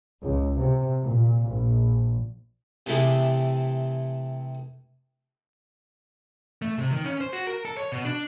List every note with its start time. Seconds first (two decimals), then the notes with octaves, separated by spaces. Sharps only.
0.23 C#2
0.59 C3
1.02 A#2
1.49 A#1
2.86 C3 E3 A3 E4 G#4
6.62 A3
6.78 C3
6.91 D#3
7.04 C#4
7.21 C5
7.33 F#4
7.47 A#4
7.65 A4
7.77 C#5
7.92 B2
8.05 D4